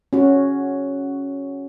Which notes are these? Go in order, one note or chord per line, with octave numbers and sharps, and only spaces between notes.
C#4 F#4